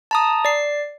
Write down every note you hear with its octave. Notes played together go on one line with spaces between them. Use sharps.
A5 A#5 D#6
D5 C7